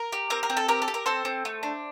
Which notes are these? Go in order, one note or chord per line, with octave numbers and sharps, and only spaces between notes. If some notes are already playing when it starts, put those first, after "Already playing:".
Already playing: A#4
G4
C4 A#4
A#4
C4
A4
G4 A#4
A4
G4
A#4
C4 A4 C5
C4
A3
D4